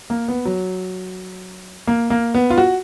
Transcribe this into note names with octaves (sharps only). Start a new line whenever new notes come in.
A#3
B3
F#3
A#3
A#3
B3
F4
F#4